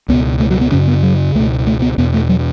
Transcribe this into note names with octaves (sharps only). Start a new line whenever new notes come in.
C#2 B2 B3
A3
F#3
B3
F#2 C#3 C#4
B3
F#3
C#2 B2 A3
A3
B3
E2 B2 B3
A3
F#3